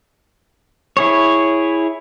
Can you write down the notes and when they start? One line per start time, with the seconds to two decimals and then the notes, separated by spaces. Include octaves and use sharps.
0.97 E4 G#4 C#5